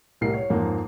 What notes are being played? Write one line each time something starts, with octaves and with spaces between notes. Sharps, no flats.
C2 A2 A#4 C7
C#5
F2 G#2 A#3